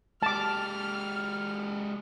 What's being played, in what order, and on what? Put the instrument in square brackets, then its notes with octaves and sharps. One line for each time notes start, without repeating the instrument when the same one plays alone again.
[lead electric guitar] G#3 G4 [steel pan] A5 D6 [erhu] F6